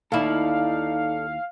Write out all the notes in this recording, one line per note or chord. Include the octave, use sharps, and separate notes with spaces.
D#2 D#4 E4 A4 D5 F5